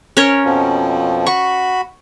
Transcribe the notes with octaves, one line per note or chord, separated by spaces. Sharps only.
C#4 A#4 C#5
F2 B2 F3
F#4 B5 C#6